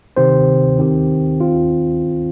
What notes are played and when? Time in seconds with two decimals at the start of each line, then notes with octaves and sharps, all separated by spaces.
0.17 C3 D#3 C4 G4 C5
0.78 D#3 C4 G4
1.41 D#3 C4 F4